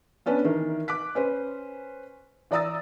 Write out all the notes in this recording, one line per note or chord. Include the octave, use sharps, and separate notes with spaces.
B3 C#4 D4 B4
D#3 E3 A#4
D6 F#6 B6
C#4 B4 C5
E3 D5 A#5 D#6 E6 A6